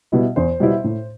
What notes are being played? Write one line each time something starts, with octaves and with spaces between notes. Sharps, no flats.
B2 G3 B3 E4
E2 C5
B2 G3 B3 E4
A2